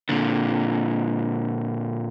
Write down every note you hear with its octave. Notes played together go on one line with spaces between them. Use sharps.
A#2 D3